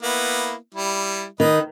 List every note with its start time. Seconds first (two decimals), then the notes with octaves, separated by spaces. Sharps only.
0.02 A#3 B3 E4
0.75 G3 E4
1.40 D#3 B4 D#5